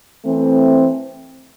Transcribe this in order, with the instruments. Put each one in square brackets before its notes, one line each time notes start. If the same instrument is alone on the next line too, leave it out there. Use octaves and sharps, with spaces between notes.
[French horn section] E3 A3 C4